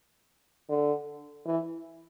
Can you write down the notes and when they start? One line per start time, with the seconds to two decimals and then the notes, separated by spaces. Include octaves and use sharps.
0.69 D3
1.45 E3